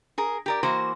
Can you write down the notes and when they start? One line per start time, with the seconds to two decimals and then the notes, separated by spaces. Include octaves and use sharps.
0.18 G#4 A#4
0.46 G4 A#4 D5
0.63 E3 A#3 F#4 C5